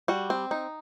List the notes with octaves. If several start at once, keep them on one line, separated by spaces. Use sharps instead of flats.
G3 F#4
C4
D#4